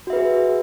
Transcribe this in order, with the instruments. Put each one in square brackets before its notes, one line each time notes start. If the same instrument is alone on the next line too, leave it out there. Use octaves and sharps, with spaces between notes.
[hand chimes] F#4
E5
B4
G#4